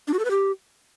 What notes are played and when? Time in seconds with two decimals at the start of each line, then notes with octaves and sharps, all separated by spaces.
0.08 D4
0.13 F#4
0.19 A4
0.25 B4
0.31 G4